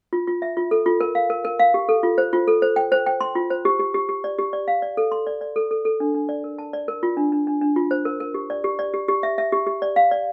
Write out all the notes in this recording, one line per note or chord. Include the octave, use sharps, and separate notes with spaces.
F4
F4
E5
F4
A4
F4
A#4
F5
A#4
A#4
F5
G4
A4
F4
C5
F4
A4
C5
G5
C5
G5
C6
F4
C5
G4
G4
G4
G4
D5
G4
D5
F5
D5
A4
C6
D5
D5
A4
A4
A4
D4
D4
D5
A#4
A5
D5
A#4
F4
D4
D4
D4
D4
F4
C5
A#4
A#4
G4
D5
G4
D5
G4
G4
E5
E5
G4
G4
D5
F5
D5